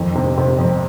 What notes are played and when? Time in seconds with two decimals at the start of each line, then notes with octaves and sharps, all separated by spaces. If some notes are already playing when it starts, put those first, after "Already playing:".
Already playing: F2 D#3
0.15 C3
0.38 C3
0.59 F2